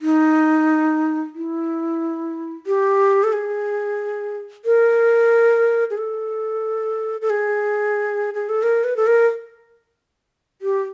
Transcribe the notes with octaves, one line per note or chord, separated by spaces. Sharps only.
D#4
E4
G4
A4
G#4
A#4
G#4
A4
A4
G#4
G#4
A4
A#4
B4
A4
A#4
G4